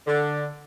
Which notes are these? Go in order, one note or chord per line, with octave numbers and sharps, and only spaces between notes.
D3